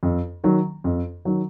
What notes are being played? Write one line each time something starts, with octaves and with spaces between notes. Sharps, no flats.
F2
D#3 F#3
F2
D#3 F#3